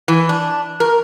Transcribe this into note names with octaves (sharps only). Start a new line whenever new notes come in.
E3
D4
A#4